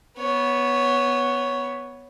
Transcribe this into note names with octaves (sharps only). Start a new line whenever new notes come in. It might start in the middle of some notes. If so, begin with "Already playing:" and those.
B3 C#5